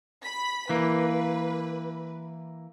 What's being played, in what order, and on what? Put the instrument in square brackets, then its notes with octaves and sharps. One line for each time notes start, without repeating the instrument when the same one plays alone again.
[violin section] B5 B6
[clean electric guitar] E3 A#3 [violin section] B4